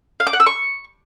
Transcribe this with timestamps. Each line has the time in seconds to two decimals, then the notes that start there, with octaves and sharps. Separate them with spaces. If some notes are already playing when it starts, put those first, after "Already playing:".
0.20 F5
0.27 D6
0.33 F#5
0.40 E6
0.46 C#6